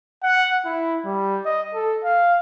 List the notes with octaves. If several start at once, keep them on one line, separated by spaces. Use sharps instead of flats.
F#5
E4
G3
D#5
A4
F5